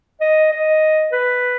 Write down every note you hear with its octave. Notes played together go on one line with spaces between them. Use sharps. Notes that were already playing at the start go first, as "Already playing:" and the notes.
D#5
D#5
B4